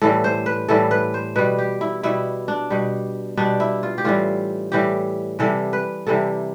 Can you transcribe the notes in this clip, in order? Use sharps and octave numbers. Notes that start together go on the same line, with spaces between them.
A2 E3 G3 A4
C5
B4
A2 E3 G3 A4
B4
C5
B2 G3 B4
G4
E4
B2 G3 E4
D4
B2 G3
B2 G3 D4
E4
F4
G4
A2 E3 G3 F4
A2 E3 G3 G4
C3 E3 G3 A4
B4
C3 E3 G3 A4